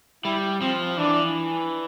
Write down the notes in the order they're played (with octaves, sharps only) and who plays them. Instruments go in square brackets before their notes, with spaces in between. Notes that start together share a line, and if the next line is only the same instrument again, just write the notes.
[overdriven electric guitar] G3 [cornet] E4
[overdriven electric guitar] F3 [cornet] C4
[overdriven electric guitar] E3 [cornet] D4